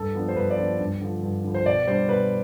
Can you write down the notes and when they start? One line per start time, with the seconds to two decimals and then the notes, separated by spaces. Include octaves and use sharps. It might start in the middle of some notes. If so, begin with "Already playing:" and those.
Already playing: G2 A4
0.15 F3 B3 D4
0.28 C5
0.36 G2 B4
0.50 D5
0.58 F3 B3 D4
0.80 G2
1.01 D3 F3
1.23 G2
1.44 D3 F3
1.54 C5
1.66 B2 D5
1.87 G3 D4 C5
2.09 B2 B4